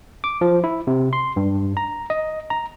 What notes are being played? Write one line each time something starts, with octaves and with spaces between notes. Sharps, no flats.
D6
F3
E4
C3
C6
G2
A#5
D#5
A#5